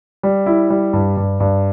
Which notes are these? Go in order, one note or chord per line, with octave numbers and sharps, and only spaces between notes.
G3
E4
G3
G2
G2
G2